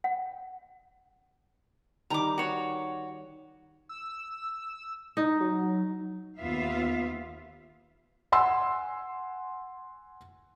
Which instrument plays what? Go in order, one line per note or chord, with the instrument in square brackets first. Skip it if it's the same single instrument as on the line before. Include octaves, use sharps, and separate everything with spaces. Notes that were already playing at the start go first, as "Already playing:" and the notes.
[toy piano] F#5
[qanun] D#3 G3 [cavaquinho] A#5 D6
[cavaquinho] F#4 C#5
[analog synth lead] E6
[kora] D#4
[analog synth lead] F#3
[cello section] D#2 B3 F4 E5 F5
[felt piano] F#5 G#5 C6 E6